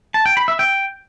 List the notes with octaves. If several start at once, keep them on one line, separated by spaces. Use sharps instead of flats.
A5
G5
B5
E5
G5